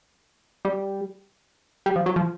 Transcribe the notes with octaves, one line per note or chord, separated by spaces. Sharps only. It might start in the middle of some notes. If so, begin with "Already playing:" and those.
G3
G3
F3
F#3
F3